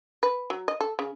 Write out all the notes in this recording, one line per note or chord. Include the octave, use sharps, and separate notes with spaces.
B4
F#3
D#5
A4
C#3